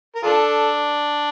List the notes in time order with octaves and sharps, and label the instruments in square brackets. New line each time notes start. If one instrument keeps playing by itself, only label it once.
[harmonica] A#4
[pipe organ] D4 [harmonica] F4 A4